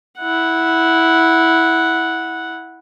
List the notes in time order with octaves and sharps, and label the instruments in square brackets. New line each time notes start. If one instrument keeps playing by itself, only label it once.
[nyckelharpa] E4 F#5